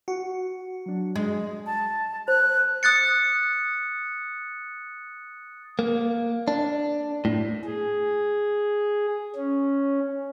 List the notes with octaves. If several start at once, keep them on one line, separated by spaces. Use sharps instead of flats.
F#4
F#3 D4
G#3
A5
C5 F#6
D#6 F#6 A6 C#7
A#3
D4
A2
G#4
C#4